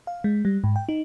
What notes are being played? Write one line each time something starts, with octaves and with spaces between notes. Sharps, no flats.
F5
G#3
G3
G#2
G5
D#4